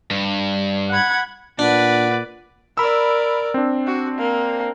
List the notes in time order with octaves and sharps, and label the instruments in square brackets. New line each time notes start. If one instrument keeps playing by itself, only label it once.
[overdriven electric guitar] G2
[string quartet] F#5 B5 G#6
[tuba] A#2 [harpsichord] D4 [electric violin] B4 D5 [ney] F#5
[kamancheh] A#4 D5 [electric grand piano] B5 E6
[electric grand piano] C4 D4
[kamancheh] F#4
A#3